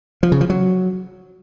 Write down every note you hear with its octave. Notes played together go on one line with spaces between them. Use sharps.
F3
C#3
F3
F#3